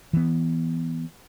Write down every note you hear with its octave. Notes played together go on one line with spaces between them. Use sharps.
E3 B3